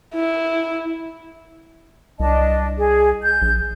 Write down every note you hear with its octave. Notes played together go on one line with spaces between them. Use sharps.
E4
C2 D4 D#5 A5
G#4
G6
A#1